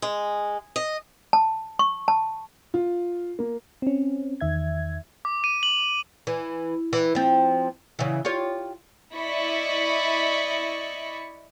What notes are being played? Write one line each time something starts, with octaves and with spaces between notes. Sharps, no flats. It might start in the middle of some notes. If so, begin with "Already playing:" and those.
G#3
D#5
A5
C#6
A5
F4
A#3
C4 C#4
E2 D#3 E5 G#6
D6
D#7
F#7
E3
E3
F3 C4
C#3 E3
F4 G4 C#5
E4 D5 D#5 B5 C#6